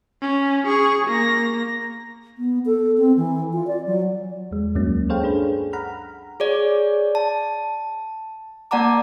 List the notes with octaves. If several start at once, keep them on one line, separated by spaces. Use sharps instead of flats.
C#4
G#4 C#6
A#3 A#6
B3
A4
C4
E3
F4
D5
F#3
E2 G#3
D2 G2 F#3 A#3 C#4
G#4 A4 C5 C#5 F5 G5
D4 G#4 B4
F#5 A#5 B5 F6
G#4 C#5 D5
A5
A#3 D5 F#5 A5 A#5 D6